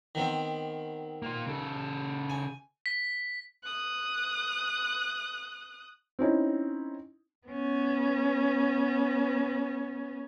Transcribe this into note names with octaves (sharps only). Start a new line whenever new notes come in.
D#3 B3 C4
A#3 F4
C#3 A4
G#5
B6
D#6 F#6
C4 C#4 D#4 E4
B3 C#4